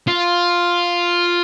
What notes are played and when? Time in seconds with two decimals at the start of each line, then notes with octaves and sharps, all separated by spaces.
0.08 F4